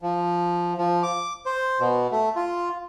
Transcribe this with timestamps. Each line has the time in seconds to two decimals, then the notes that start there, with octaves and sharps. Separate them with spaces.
0.02 F3
0.78 F3
1.03 D6
1.46 C5
1.80 B2
2.11 A3
2.36 F4